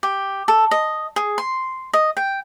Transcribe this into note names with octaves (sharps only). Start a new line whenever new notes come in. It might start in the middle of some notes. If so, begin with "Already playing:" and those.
G4
A4
D#5
G#4
C6
D#5
G5